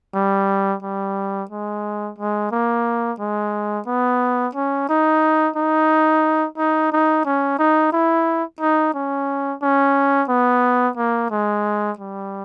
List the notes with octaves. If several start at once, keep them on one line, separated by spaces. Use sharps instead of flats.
G3
G3
G#3
G#3
A#3
G#3
B3
C#4
D#4
D#4
D#4
D#4
C#4
D#4
E4
D#4
C#4
C#4
B3
A#3
G#3
G3